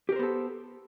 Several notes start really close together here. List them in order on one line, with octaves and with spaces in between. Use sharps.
G4 A#4 C5 B3 A4